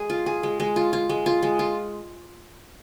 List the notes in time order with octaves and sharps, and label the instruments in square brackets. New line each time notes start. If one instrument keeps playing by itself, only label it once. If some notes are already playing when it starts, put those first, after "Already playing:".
Already playing: [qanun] G#3 G#4
F4
G#4
G#3
G#3
F4
F4
G#3
F4
G#3
F4